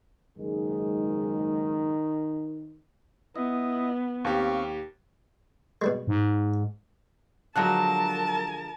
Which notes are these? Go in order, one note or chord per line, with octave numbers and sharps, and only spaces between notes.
F#1 G#2 D#3 G#3
B3 E4 D#5
D#2 C4 G4 F5 C#6
B2 G3 G#3
G#2
D3 F3 F#3 G#3 A#4 A5 F#6